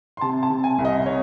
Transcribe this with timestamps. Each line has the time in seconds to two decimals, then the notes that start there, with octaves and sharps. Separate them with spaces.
0.17 C6
0.21 C3 A5
0.43 A5
0.50 C3
0.64 G#5
0.78 C2
0.85 D#5
1.06 C3 C#5